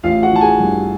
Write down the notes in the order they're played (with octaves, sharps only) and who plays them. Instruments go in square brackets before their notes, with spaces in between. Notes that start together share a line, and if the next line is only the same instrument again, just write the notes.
[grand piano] A1 F4 F5
F#4 F#5
E3 A5
G#4 G#5
G2